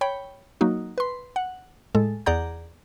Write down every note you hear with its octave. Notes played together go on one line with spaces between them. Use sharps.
C#5 G5 B5
F#3 A#3 D#4 F#4
B4 C6
F#5
A2 G#3 A4
E2 G#4 D5 F#5 A#5 G6